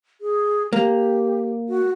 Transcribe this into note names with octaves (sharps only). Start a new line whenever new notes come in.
G#4
A#3 G4
F#4